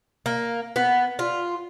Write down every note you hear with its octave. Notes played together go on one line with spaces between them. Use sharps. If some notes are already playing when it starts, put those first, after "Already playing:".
A#3
B3
F4